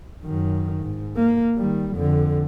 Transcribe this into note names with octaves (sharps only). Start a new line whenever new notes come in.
F#2 D#3
G#2
A#3
D#3 G3
F2 D3